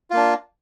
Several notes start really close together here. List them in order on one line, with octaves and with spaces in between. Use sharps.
F4 A#3 D4